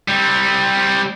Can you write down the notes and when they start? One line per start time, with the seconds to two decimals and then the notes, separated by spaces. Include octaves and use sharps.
0.08 G3 C4